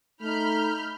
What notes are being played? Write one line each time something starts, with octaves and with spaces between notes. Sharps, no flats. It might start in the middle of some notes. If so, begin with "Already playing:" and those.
A3 D#4 B5 F6 G6